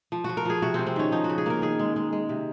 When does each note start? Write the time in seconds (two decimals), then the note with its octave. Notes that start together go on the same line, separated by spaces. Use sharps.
0.12 F3
0.24 F3 F#4
0.37 A#4
0.45 F3 G#4
0.62 C3 F#4
0.74 C3 C4
0.87 C4
0.96 D#3 C#4
1.12 F3 D#4
1.24 F#4
1.30 C#3
1.38 G#4
1.46 A#3 A#4
1.62 D#3 G#4
1.79 G#3
1.96 G#3
2.12 G#3
2.29 C3